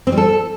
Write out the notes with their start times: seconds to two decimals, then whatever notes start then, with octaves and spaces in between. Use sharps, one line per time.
0.07 C4
0.12 G3
0.18 A4